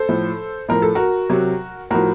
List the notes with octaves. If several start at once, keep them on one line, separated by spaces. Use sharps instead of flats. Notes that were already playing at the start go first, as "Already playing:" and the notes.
Already playing: A4 C5
A2 F3
A2 F3 A#4
A4
F#4 A#4
C3 F#3
A2 F3 F#4 A#4